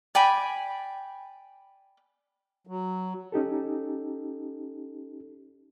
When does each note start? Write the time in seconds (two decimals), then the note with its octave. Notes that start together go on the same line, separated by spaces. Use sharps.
0.15 D5 G5 G#5 B5
2.67 F#3
3.32 C#4 D#4 G4 A4